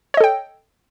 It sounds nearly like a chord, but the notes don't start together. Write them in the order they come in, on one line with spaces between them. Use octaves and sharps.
C#5 D#5 A4 G5